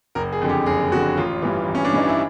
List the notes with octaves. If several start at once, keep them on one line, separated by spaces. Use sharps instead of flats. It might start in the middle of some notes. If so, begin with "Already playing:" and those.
F#1 A#4
G#4
F2 D3
G4
F#1 G#4
F2 D3 F#4
A1 F4
G2 E3
A1
C#4
D4
G2 E3 D#4
E4